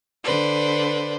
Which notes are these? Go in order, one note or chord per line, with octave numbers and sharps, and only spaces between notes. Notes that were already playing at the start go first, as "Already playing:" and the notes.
D3 B4 C5 D5